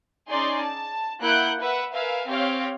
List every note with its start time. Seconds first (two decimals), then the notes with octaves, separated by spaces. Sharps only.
0.30 C#4 D#4 G#4 D5 C6
0.62 A5
1.21 A#3 E4 F#5 F#6 G6 D7
1.60 B4 E5 F#5
1.93 A#4 B4 E5 F5 G#5
2.28 C4 G4 C#5 F5